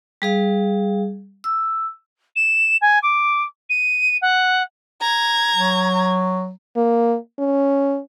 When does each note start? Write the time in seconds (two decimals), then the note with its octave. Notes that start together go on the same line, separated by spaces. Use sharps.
0.22 G3 G#4 F5
1.44 E6
2.36 E7
2.81 G#5
3.03 D6
3.70 D#7
4.22 F#5
5.02 A#5 G#6
5.55 F#3
6.77 A#3
7.39 C#4